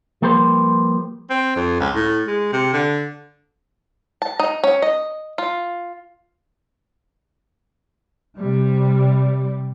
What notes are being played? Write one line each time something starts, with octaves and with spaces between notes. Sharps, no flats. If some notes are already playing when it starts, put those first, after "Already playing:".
F3 G3 A#3 G4 B4 C5
C4
F2
C#2
A2
G#3
C3
D3
A5
D#4
C#4
D#5
F4
C3 G3